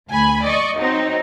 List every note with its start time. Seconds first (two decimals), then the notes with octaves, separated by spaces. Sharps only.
0.11 D2 G#5 B5
0.44 D5 D#5 C#6
0.80 F#3 C4 D#4